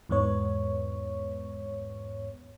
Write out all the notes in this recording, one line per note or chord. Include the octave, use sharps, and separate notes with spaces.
E2 G#2 B3 C#5